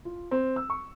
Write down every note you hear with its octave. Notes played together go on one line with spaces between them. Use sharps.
F4
C4
E6
C#6